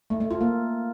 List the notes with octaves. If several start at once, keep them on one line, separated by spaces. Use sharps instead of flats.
A3
A3
F4
A#3